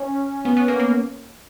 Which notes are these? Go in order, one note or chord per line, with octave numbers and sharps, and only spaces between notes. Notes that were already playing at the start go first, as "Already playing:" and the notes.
Already playing: C#4
B3
B3
A#3
A#3